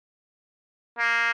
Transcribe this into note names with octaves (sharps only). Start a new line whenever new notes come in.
A#3